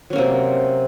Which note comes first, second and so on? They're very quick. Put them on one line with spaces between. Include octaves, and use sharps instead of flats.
F#3 C#4 A#3 C3